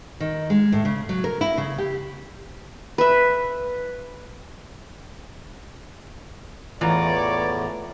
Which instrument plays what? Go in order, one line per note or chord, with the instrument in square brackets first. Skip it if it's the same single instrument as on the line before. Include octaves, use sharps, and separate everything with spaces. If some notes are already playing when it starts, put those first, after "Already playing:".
[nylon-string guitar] D#3
G#3
A2
C#3
F#3
A#4
E4
C#3
G4
[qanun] B4 E5
[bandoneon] E2 A2 [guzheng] E3 [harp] F4 A#5 [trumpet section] C#5 D5